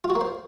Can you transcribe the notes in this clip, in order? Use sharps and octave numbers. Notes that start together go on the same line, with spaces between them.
F4
F#4
A#3
C5